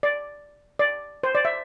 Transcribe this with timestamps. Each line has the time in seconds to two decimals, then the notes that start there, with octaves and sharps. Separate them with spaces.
0.03 D5
0.79 D5
1.23 C5
1.35 D5
1.45 E5